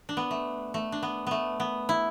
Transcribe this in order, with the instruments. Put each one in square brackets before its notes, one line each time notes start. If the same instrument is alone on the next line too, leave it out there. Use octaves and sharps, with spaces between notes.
[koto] D4
B3
A3
A3
D4
B3
A3 B3
B3
E4